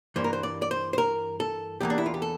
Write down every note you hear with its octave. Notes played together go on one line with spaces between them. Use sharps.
G2 E3 A#3 C5
A#4
C5
D5
D5
C5
C5
A#4
A4
E2 E3 A#3 G4
D4
E4
F4
G4
A4